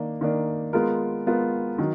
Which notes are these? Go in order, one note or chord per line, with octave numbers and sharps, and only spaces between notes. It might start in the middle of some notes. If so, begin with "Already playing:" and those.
Already playing: D#3 A#3 D4
D#3 A#3 D4
G#3 B3 F4 A#4
G#3 B3 F4 A#4
D#3 F#3